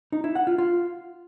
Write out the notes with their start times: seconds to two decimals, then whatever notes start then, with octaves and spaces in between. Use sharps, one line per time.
0.12 D#4
0.24 E4
0.35 F#5
0.47 F4
0.58 F4